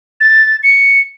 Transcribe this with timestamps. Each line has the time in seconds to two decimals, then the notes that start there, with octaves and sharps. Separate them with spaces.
0.20 A6
0.63 C#7